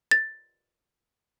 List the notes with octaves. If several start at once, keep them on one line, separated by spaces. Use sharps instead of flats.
A6